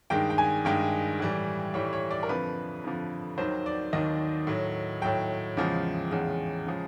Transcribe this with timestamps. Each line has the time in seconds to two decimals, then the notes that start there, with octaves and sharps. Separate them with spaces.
0.10 G2 D#3 G#3 G5
0.30 G5
0.38 G#5
0.65 G2 D#3 G#3 G5
1.20 A2 E3 G3
1.74 A2 E3 G3 C#5
1.93 C#5
2.11 D5
2.23 A#4
2.29 F2 D3 F3 B4
2.84 F2 D3 F3
3.38 D#2 D#3 F#3 C5
3.66 D5
3.93 D#2 D#3 F#3 D#5
4.47 A2 F#3
5.02 A2 F#3 G5
5.57 E2 C#3 F3 G#3
6.11 E2 C#3 F3 G#3
6.66 C#3 F3 G#3